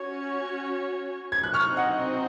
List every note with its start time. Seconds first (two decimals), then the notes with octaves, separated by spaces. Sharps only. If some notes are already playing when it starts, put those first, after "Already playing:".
Already playing: C#4 F#4 C#5
1.32 G#6
1.43 F#6
1.54 C4 D#4 F#4 C#6 F6
1.76 D#5 F#5